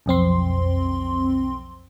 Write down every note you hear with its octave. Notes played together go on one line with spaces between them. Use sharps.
B1 F2 C4 C6